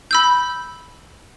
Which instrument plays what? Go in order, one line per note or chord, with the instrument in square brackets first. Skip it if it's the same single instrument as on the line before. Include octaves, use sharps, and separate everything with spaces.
[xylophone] B5 E6 G6